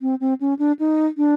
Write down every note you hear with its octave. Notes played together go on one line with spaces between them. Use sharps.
C4
C4
C#4
D4
D#4
D4